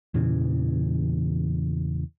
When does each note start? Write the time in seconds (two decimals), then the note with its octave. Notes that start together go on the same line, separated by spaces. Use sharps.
0.14 E2 A#2 C#3 E3